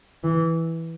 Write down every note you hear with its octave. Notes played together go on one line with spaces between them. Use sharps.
E3